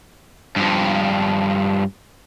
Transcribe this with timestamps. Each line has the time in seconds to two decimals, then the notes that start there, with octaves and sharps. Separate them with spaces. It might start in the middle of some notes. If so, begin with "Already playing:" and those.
0.56 G2 F3